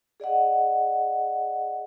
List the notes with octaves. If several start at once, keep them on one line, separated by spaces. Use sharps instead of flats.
G#4 D5 D#5 F#5